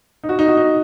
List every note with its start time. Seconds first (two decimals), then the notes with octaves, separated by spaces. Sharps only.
0.24 D#4
0.29 F#4
0.39 D#4
0.48 F#4
0.57 D#4